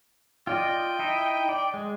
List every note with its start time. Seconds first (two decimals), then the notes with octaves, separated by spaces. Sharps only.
0.47 F4 D5 D#5 G5
0.99 D#4 E4 D#5
1.49 D5
1.74 G#3